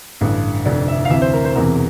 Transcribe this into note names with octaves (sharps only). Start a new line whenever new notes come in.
A1 G2 D3
F1 F2 D3 D5
E5
F5
D2 C3 E3 E5
C5
A#4
C5
E1 E2 C3 E3 A#4